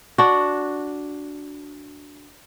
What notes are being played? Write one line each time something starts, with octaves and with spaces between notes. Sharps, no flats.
D4 F#4